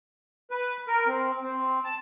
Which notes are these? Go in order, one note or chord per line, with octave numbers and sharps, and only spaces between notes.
B4
A#4
C4
C4
A5